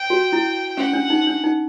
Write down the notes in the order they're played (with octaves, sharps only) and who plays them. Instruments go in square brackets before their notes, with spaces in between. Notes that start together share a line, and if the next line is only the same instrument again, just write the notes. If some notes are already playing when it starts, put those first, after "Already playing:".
Already playing: [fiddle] G5
[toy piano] F#4
E4
[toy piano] C#4 [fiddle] F#5
[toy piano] D4
D#4
D4
D#4